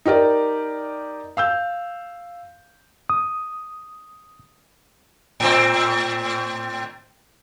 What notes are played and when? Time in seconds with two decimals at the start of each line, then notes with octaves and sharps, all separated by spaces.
0.05 D#4 G4 A#4 D5
1.37 F5 E6 G6
3.10 D#6
5.40 A2 C4